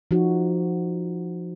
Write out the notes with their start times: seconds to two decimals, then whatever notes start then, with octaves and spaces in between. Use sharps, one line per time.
0.11 F3 D#4 F#4